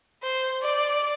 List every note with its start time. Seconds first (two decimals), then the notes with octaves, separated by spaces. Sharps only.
0.23 C5
0.62 D5